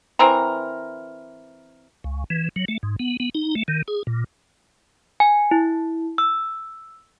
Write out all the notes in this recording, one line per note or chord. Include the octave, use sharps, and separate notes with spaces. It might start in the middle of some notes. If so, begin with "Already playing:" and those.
E3 C4 A#4 A#5
C#2
E3
F#3
A3
G#2
B3
B3
D#4
A3
D#3
G#4
A#2
G#5
E4
E6